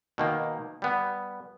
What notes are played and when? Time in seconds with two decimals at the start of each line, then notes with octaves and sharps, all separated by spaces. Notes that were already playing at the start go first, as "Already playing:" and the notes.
0.18 B2 D#3 A#3
0.82 G3 B3